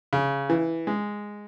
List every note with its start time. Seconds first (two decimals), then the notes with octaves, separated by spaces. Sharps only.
0.13 C#3
0.50 E3
0.87 G#3